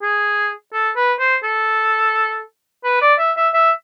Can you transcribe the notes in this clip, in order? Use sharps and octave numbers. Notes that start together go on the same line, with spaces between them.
G#4
A4
B4
C5
A4
B4
D5
E5
E5
E5